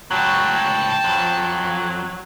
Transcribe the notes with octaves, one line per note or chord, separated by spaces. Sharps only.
C#2 A2 F#3 G5 A5
F2 F#3